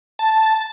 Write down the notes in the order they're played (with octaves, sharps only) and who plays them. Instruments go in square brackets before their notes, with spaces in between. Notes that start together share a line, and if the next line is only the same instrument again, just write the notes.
[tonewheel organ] A5